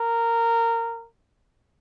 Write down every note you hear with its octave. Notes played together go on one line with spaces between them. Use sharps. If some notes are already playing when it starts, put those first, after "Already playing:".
Already playing: A#4